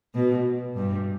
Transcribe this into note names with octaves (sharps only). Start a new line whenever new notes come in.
B2
G2